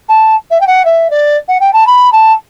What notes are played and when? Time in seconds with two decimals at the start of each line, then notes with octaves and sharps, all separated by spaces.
0.08 A5
0.50 E5
0.60 G5
0.67 F#5
0.85 E5
1.10 D5
1.48 F#5
1.60 G5
1.73 A5
1.87 B5
2.12 A5